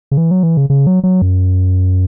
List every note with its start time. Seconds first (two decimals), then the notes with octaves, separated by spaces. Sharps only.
0.11 C#3
0.17 E3
0.31 F#3
0.43 E3
0.57 C#3
0.70 C#3
0.87 F#3
1.03 F#3
1.22 F#2